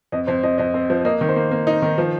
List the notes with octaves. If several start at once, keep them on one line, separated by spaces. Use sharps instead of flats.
F2 D#5
F2 C5
F2 D#5
F2 D#5
C4
F3
A#3 D#5
D#3
C5
A#3
A#3
D#4
D#3
F3